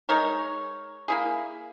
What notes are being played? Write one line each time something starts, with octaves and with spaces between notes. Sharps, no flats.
G#3 D#4 A#4 C#5
A#3 E4 G#4